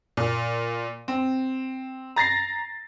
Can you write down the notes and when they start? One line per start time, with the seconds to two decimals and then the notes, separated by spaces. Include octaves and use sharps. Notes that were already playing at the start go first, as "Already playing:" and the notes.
0.17 A#2
1.08 C4
2.16 A#5 A6 A#6 C7